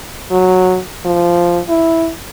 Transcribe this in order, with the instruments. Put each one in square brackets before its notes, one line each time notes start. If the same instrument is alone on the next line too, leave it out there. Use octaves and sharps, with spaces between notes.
[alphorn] F#3
F3
E4